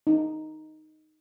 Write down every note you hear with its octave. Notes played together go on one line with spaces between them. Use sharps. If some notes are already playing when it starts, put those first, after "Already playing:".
D#4